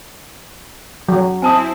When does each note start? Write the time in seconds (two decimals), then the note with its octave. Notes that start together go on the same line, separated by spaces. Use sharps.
1.09 F#3
1.42 C4 E4 G#5 A5 D#6